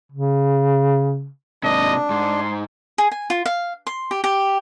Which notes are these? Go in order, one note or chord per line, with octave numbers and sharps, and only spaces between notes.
C#3
G#2 C3 D4 D#5
G#2 C6
G#4
G#5
F4
F5
C6
G4
G4